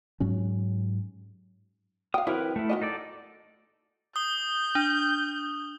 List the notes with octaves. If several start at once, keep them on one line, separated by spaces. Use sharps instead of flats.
G#2 F#3 C#4
F5 G5 D#6
E3 F#3 C4 E4 A#4 B4
A3 E4
D#3 F#3 D#5
D#4 A4 D5
D#6 G6 G7
D4